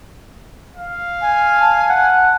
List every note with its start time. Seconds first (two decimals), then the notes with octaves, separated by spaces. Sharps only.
0.77 F5
1.21 G#5
1.56 A5
1.89 F#5